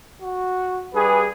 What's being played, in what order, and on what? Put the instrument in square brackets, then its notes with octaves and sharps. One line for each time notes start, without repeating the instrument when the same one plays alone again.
[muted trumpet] F#4
[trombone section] G2 G#4 [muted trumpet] B4